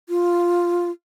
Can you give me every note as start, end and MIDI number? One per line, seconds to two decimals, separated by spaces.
0.09 0.91 65